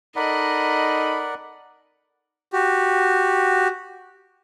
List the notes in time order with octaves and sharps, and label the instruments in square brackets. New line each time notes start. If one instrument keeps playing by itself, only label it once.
[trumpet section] D#4 A4 [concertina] A#4 D5 F#5 [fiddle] D#5 [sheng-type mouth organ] B5
[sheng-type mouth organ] F#4 G4